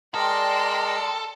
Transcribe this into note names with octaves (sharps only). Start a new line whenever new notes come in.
G#3 A4 A#4 D5 D#5 G5 C6